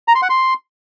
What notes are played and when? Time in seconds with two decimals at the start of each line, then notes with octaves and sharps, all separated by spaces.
0.08 A#5
0.15 C6
0.22 F#5
0.30 C6